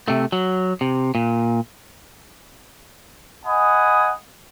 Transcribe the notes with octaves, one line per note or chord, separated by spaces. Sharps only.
C3 A3
F#3
C3
A#2
D#5 F#5 G#5 B5 D#6